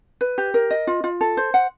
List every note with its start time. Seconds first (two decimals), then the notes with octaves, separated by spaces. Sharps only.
0.21 B4
0.38 G4
0.54 A#4
0.71 D#5
0.87 F4
1.04 F4
1.21 A4
1.37 C5
1.54 F#5